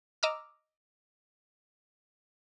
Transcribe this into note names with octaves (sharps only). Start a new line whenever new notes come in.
D#5 A#5 D6 E6 F6